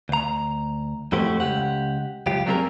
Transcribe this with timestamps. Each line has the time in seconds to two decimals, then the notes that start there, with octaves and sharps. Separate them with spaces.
0.09 D2 A#5
1.12 F2 A2 A3 F#4 G4 C5
1.40 C#2 C#3 G4 F#5
2.26 C#2 F#2 F4 G4
2.46 F#3 G3 A#3 C4 G#4 A#4